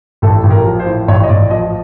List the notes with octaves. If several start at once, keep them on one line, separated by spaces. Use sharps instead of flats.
A1 A4
A1
A#4
F3
C5
A2
A1 C#5
D#5
A1 D5
F3 D#5